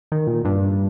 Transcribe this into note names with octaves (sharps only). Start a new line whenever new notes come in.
D#3
A#2
G2